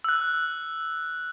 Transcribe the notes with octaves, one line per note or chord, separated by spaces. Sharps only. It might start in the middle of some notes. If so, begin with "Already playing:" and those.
E6 F#6